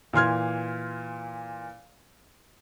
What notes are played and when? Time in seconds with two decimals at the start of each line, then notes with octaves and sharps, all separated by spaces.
0.13 A#2 E3 C6 F6 G#6